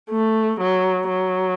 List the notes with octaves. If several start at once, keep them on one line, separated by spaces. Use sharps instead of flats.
A3
F#3
F#3